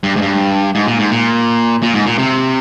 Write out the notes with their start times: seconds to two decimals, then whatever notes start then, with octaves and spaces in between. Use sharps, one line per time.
0.03 G2
0.16 G#2
0.22 G2
0.75 G#2
0.87 A#2
0.99 G#2
1.11 A#2
1.83 A#2
1.94 G#2
2.06 A#2
2.18 C3